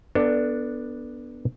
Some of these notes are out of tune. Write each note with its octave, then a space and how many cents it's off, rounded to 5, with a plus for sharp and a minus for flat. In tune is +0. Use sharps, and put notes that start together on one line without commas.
B3 -5 D4 +0 A4 +20